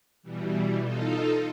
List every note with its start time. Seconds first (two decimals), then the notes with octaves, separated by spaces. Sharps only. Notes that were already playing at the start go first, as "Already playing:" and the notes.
0.23 B2 E3 G3
0.81 D#4 F4 A4